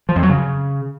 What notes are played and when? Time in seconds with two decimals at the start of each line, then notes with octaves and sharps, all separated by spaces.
0.09 F3
0.16 F2
0.23 F#3
0.30 C#3